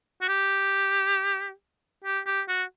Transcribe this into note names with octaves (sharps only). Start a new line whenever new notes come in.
F#4
G4
G4
G4
F#4